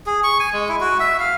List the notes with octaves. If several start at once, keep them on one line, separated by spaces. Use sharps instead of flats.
G#4
C#6
G#5
G#3
E4
F#4
E5
F5